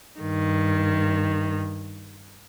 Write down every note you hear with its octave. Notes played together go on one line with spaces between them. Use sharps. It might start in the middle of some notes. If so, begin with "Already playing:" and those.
G2 D#3